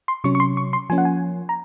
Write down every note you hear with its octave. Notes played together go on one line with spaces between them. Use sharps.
C6
C3 F#3 C#4 C#6
C#6
C6
C#6
C6
F3 A#3 C#4 G#5
F#5
G#5
A#5